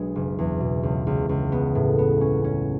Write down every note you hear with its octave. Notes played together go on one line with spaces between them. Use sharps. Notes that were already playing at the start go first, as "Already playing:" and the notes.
Already playing: B1 G#3 D4
F#1
E2
B2
C#2
C#2
C#2
B3
A2
B3
C#4
C#4